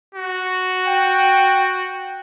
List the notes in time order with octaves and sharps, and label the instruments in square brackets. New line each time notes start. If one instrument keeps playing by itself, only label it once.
[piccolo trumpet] F#4
[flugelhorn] G5